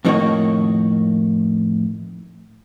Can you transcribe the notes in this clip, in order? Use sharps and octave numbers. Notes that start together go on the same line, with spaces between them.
F2 A2 D#3 A#3 F#4 C#5